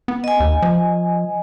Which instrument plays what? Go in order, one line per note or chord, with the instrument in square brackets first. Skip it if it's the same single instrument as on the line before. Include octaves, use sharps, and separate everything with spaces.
[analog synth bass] B3
[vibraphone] D#5 G#5
[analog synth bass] D#2
F3